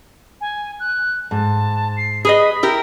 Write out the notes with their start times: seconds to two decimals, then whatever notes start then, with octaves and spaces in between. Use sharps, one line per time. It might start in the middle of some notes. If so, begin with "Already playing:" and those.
0.41 G#5
0.80 F#6
1.31 G#2 A5
1.97 C7
2.25 G#4 B4 D#5 B5
2.63 E4 G4 A#4